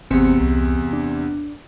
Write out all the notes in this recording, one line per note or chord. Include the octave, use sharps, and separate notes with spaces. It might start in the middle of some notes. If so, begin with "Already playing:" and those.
G#1 E2 C3 C4 C#7
C2
D4